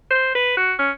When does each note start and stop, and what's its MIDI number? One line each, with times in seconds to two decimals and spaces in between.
0.11 0.33 72
0.35 0.56 71
0.57 0.73 66
0.79 0.91 61